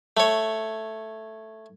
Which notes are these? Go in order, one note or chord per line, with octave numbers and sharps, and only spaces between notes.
A3 C#5